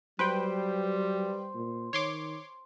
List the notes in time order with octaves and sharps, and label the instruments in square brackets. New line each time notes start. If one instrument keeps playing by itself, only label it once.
[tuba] F#3 [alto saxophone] G3 [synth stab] B4 G5 [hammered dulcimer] C5
[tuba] A#2
[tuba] D#3 [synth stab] C#5 C6 D6